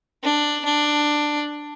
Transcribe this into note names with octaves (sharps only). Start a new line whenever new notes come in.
D4
D4